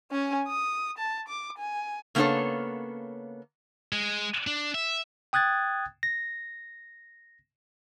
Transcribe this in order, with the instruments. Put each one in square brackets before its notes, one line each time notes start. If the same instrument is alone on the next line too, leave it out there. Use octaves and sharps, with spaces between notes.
[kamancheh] C#4 G#5
D#6
A5
D6
G#5
[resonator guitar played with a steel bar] C#3 A#3 B3 D4 A4 C#5
[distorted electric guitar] G#3
D4
E5
[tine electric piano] G5 D#6 F#6 G#6 A6
A#6